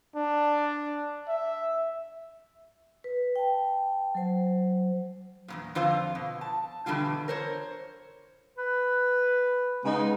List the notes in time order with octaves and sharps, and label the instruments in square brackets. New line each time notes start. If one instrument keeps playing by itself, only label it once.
[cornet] D4
E5
[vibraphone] B4
G5 A5
F#3 C5
[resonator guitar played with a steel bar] E2 G2 A#2
F2 D3 F4 C5 F5
B2
A5
B2 D3 E3 G3 F4
A#4 C5 C#5
[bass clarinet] B4
[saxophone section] C#3 B3 D#4 [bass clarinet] G#3